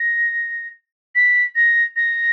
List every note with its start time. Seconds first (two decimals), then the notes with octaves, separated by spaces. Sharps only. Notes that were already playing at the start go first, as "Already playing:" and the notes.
Already playing: A#6
1.15 B6
1.56 A#6
1.96 A#6